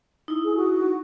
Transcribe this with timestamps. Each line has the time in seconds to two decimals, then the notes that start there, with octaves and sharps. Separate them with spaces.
0.28 D#4 E4
0.44 G#4
0.55 F#4